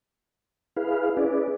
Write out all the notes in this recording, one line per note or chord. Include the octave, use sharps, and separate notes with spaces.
E4 G#4 B4 F5
C#4 E4 G#4 B4 D5